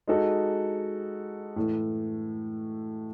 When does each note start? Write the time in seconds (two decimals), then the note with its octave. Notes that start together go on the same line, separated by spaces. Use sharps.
0.08 G#3 D#4 F#4 A4
1.56 A2 E3 A3